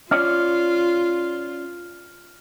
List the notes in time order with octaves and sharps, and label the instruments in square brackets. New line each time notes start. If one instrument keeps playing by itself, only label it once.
[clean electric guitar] C#4 C#5 D5 [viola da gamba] F4 [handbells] F6